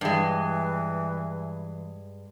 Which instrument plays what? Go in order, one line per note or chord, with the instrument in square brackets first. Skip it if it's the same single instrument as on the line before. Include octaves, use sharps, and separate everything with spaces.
[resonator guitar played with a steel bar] G2 G#3 [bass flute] E3